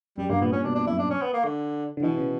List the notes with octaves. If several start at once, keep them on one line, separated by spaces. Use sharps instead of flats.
F#2 G3
G2 A#3
A#2 B3
A#2 C#4
B2 D4
A#2 D4
F#2 E4
D4
C#4
B3
A#3
D3
D3
B2 E3
C#3